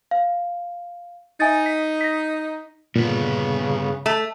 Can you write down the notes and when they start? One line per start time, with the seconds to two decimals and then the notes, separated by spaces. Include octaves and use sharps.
0.11 F5
1.40 D#4 E5 G#5 A6
1.66 B6
2.01 A#6 B6
2.96 G2 A#2 C#3 B3
4.06 A3